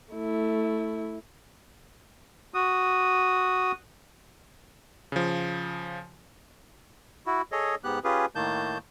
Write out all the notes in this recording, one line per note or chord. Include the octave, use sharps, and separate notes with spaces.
A3 E4
F#4 D#6
C#3 F3
E4 F#4
G#4 A4 C#5 D#5
G#2 B3 G4 F#6
C#4 F4 G4 G#4 B4
A2 D#3 A#3 A5 G6